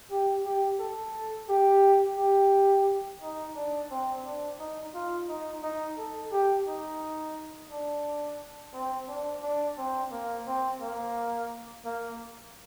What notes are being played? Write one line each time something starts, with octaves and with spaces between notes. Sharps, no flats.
G4
G4
A4
G4
G4
D#4
D4
C4
D4
D#4
F4
D#4
D#4
A4
G4
D#4
D4
C4
D4
D4
C4
A#3
C4
A#3
A#3